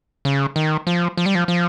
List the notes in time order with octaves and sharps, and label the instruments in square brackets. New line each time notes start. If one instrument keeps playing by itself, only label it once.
[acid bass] C#3
D#3
F3
F3
G3
F3
F3